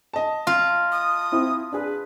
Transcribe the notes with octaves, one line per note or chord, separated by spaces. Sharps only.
D#5 A5
F4
D#6
C4 E4
D4 G#4 B4